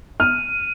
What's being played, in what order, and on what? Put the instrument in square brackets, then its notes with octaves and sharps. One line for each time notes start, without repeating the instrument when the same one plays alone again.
[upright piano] F6 [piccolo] D#7